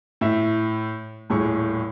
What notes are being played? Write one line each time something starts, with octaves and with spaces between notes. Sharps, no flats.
A2 E5
D#1 A2 G#4 C#6